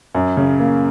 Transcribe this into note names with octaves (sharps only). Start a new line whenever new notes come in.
F#2
C#3
A#3